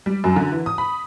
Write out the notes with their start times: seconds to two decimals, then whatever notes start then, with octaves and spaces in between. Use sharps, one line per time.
0.06 G3
0.24 F#2
0.36 D3
0.52 E3
0.66 D#6
0.78 B5